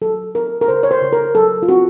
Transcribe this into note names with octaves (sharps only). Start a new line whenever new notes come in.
F#3 A4
C4 A#4
A#4
C#3 C5
C#5
C5
C#3
A#4
F#3 A4
F4
C4 F#4